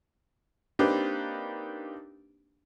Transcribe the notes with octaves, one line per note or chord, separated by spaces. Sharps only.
A#3 C4 D4 D#4 G4 B4